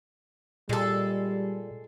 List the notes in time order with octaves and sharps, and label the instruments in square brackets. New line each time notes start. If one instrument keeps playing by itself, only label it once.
[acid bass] A#2 [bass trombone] G3 [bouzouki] G#3 A4